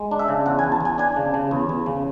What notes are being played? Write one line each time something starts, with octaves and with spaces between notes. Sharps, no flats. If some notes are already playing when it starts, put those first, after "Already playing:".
Already playing: G#3
D4
E5
C#3
E2 F#5
G#5
E2
A5
E2 G#5
D4 G#5
C#3
C#3
E2
E2
C#3